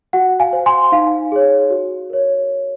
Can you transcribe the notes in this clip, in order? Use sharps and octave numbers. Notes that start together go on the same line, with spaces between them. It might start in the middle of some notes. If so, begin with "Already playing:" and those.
F#4 F#5
F5 G#5
C5
G#5 C6
D#4 F5
G#4 C#5
F#4
A#4 C#5